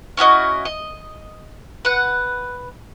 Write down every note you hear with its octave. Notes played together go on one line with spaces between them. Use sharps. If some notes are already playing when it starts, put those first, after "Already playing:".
C#4 E4 F#4 D#5
D#5
B4 F#5